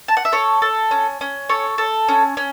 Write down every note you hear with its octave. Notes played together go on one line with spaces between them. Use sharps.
A5
F#5
E5
A4 C#5
A4
C#4
C#4
A4 C#5
A4
C#4
C#4